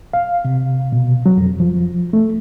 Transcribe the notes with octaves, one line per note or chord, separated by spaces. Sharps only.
F5
C3
B2
F#3
F2
F3
A3